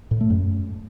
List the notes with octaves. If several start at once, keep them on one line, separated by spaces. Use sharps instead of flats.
A2
A3
F#2